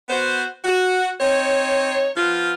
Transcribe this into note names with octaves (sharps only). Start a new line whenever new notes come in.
B3 F#4 C5
F#4
C4 D#4 C#5
F3 B3 F4